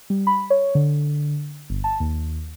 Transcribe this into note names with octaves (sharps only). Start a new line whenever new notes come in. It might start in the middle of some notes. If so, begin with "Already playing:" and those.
G3
B5
C#5
D3
G1
A5
D#2